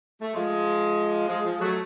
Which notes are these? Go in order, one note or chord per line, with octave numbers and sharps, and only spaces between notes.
A3
F3 G#3
F3 G#3
F3 G#3
F#3 A3